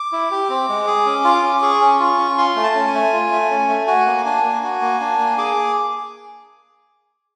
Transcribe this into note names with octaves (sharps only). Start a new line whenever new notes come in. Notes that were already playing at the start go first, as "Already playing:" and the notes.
Already playing: D6
E4
G4
C4
G#3
G#4
C#4
F4
C#4
G#4 C#6
C#4
F4
C#4
F4 C6
A3
A5
C#4
G#5
A3
F4
A3
C#4
A3
F#4 G#5
A#3
D4 G#5
A#3
F#4
A#3
D4
A#3
G#4 D6